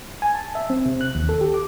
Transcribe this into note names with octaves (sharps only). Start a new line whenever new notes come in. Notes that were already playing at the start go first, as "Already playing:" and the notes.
G#5
A5
E5
C4
C3
F#6
D#2
A4
G4
D6